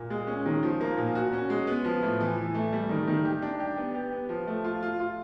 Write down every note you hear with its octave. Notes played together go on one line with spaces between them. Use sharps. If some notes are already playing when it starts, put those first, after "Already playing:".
Already playing: A#2
G#3
C#4
D#3
F3
A#3
A#2
F#4
C#4
G#3
B3
F3
A2
E3
E3
A3
G3
D#3
D#3
G4
D4
G4
B3
G4
B3
F3
A3
F4
F4
F4